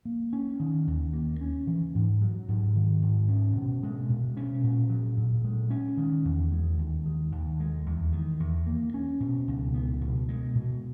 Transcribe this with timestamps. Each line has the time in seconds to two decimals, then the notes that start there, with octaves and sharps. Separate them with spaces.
0.05 A#3
0.33 C#4
0.60 D#3
0.87 D#2
1.13 A#3
1.41 C#4
1.67 E3
1.95 G#2
2.21 F#3
2.48 G#2
2.75 D#3
3.02 G#2
3.29 C#4
3.56 B2
3.83 G#3
4.09 B2
4.36 C#4
4.63 A#2
4.90 F#3
5.17 A#2
5.44 G#3
5.70 C#4
5.97 D#3
6.25 E2
6.52 G#3
6.78 D#2
7.06 D#3
7.32 D#2
7.60 G#3
7.86 E2
8.13 D#3
8.40 E2
8.67 A#3
8.94 C#4
9.20 B2
9.48 C#2
9.74 B3
10.01 B2
10.29 G#3
10.55 B2